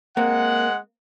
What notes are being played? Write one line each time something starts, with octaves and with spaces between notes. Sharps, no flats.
G#3 A#3 C4 F#5